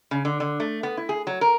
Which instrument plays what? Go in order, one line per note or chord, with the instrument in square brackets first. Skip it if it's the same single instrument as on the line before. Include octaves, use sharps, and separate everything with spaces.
[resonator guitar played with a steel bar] C#3
D3
D3
A3
B3
E4
G#4
F#3
A#4